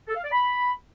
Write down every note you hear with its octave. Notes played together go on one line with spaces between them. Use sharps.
A4
F5
D5
B5